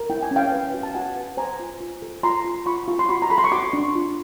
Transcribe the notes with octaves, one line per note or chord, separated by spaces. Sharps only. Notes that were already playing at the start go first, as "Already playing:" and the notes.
Already playing: A#4
E4 G5
G#5
C#4
F5 G5
B4
F#4
A5
F#4 F#5 G#5
B4
C5 G#5 A#5
F4
F4
A4
F4 A#5 C6
F4
F4 B5 C#6
F4
C6
F#4 B5 C#6
A#5
A4 B5
C6
C#6
F#4 C6 D6
D4
F4